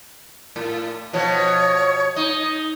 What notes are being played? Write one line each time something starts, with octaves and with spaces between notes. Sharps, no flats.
A2
B2 F3 C#5
D#4 D#6